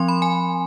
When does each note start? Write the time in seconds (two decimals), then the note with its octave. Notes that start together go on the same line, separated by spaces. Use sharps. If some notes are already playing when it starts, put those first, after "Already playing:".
Already playing: F3 C4 C6
0.08 B5
0.22 G#5